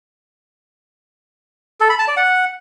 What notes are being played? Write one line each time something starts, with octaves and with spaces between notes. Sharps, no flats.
A4
B5
A5
D5
F#5